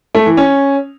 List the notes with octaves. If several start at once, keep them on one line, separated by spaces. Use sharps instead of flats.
A3
E3
C#4